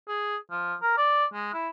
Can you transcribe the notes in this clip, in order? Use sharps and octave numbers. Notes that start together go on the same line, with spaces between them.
G#4
F3
A#4
D5
G#3
E4